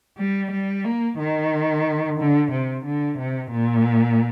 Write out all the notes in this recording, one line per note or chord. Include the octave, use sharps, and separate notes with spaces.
G3
G3
A#3
D#3
D3
C3
D3
C3
A#2